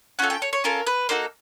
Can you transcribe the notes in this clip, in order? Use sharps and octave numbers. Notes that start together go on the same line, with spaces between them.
C#4 F4 A4 F#5
G5
C#5
C#5
C#4 F4 A4 A#4
B4
A#3 D#4 F#4 A4 C5